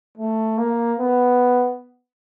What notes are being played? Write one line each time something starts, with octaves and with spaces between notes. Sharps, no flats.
A3
A#3
B3